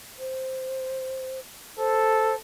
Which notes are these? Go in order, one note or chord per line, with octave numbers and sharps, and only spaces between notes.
C5
A4 C5